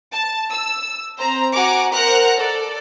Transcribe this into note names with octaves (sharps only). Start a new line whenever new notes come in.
A5
E6
C4 C5 A#5
F#4 F#5 G#5 A#5 D6
A#4 C5 F#5 A#5 F#6
A4 D5